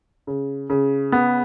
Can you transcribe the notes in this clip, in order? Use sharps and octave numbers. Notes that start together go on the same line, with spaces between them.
C#3
C#3
B3